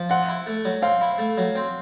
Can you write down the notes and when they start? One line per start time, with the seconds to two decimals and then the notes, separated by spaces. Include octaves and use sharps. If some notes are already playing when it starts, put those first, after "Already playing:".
Already playing: F3
0.09 C4 F#5
0.29 E4
0.46 A3
0.65 F#3
0.82 C4 F5
1.01 E4
1.18 A3
1.38 F#3
1.55 C4